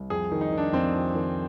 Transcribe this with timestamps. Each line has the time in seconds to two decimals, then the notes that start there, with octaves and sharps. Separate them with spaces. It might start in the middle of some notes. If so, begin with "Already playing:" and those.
Already playing: C2
0.10 F2 G#4
0.32 D#3
0.41 D#4
0.53 D#3 D4
0.72 F2 C4
0.94 F2
1.15 D#3